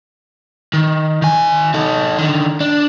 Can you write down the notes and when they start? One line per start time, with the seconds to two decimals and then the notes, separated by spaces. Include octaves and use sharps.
0.74 D#3
1.22 D#3 G#5
1.74 D#4 A4
2.18 D3 D#3
2.61 D4